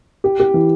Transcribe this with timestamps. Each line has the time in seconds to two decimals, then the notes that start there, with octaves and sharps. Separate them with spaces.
0.24 G4
0.40 G4
0.54 E3